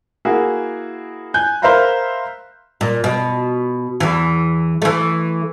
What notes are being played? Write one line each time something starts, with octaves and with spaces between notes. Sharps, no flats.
A#3 E4 F#4 G#4
G#5 F#6 G6
A#4 C5 E5 F5 A#5 B5
A#2
B2
E2 E3
E3 A3